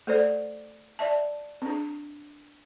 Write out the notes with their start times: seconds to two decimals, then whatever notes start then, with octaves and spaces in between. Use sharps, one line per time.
0.07 A3 A4 C5 D5
0.99 D5 E5 A5
1.62 C4 D4